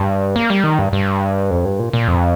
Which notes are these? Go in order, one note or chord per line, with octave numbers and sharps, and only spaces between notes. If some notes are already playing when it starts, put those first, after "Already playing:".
Already playing: G2
A#3
G3
D#3
G2
G2
F2
G2
A#2
A#2
F2